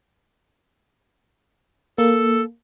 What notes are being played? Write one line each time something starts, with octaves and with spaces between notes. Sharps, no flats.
A#3 A4